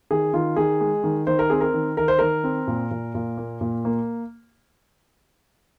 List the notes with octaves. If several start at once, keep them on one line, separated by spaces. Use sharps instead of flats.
D#3 G#4
D#3 F4
D#3 G#4
G#3
D#3
D#3 C5
A#4
C4 G#4
A#4
D#3
D#3 A#4
C5
D#3 A#4
C4
A#2
A#2
A#2
A#3
A#2
A#3